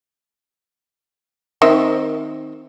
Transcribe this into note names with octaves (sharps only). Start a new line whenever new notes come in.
D#3 C4 E5